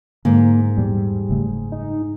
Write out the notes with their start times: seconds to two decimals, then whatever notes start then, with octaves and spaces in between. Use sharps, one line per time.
0.25 G#2 D3 A#3
0.77 E2 A#2 G3
1.29 F#1 C#3 A3
1.72 D#4